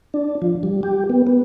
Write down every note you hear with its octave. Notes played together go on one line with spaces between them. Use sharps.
D4
F3
G3
G4
B3
B3